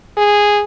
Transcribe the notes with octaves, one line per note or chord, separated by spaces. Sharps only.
G#4